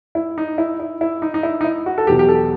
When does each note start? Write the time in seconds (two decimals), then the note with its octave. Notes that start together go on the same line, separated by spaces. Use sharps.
0.15 E4
0.38 D#4
0.58 E4
0.80 E4
1.01 E4
1.22 D#4
1.34 D#4
1.43 E4
1.61 D#4
1.64 E4
1.86 F#4
1.98 A4
2.07 E2 B2 F#3 G4
2.19 G4
2.28 A4